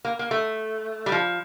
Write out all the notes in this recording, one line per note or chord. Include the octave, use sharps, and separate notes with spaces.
A#3
A#3
A3
G3
F3